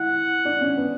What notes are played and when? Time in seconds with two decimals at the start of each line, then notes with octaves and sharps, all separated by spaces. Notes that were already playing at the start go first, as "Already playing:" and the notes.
Already playing: E4 F#5
0.45 D4
0.61 C#4
0.77 B3